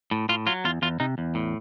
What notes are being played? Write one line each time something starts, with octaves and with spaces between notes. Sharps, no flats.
A2
A2 F4
F#3 F4
E2 F4
E2 F4
C3 D#4
E2
A2